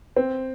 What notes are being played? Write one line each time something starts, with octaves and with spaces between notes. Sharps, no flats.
C4